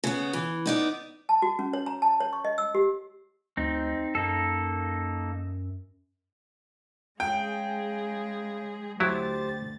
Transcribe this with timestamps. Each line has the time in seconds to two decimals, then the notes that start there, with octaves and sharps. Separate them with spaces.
0.04 C#3 B3
0.33 E3
0.66 B3 D#4 D5
1.29 A5
1.42 F#4
1.59 C#4
1.73 C#5
1.86 A#5
2.02 A5
2.20 C#5
2.33 C#6
2.45 D#5
2.58 E6
2.75 G4
3.57 D2 C4 D#4
4.15 F#2 A#3 D#4 A4
7.20 C#3 G#3 G#4 G5
9.00 D2 F#3 E4 G4 C5 A6